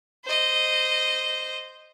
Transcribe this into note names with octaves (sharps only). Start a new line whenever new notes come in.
C5 D#5